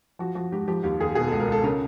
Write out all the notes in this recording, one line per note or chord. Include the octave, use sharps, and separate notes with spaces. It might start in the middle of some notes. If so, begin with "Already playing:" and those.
F3 F#4
F3 F#4
G#2 G4
F3 G4
D#2 G4
D#2 G#4
B2 G#4
C#2 A4
A#4
C#2 A4
C#3 A#4